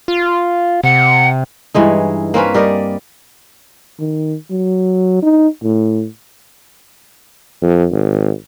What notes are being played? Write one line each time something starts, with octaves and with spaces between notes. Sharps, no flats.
F4
C3 F#5
G2 E3 G#3 D#4
A#3 C4 C#4 B4
G3 A#4 D5 D#5
D#3
F#3
D#4
A2
F2
G#1